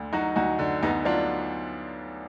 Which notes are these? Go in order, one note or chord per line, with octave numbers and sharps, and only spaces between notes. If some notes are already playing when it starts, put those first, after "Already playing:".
Already playing: D2 D3
F#3 D#4 F#4
D2 D#4 F#4
D3
D2 B3 D#4
F#3 D4 F4